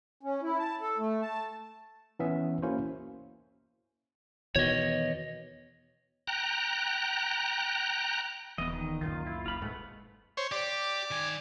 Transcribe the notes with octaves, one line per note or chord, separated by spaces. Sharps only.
C#4
E4
A5
A4
A3
A5
E3 B3 C#4 E5
A#3 C#4 E4 F#4 C5
E2 B2 D#3 C#5 D#5
G5 A#5 F#6
D#1 E3 B3 D#5
D#3
C#2 F#2 A#2 D#3 F4
E4
F#1 F4 B5
G#2 B2 G#3 A3 B3
C5 C#5
G4 D5
D#3 G#5